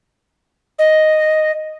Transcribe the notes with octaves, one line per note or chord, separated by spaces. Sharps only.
D#5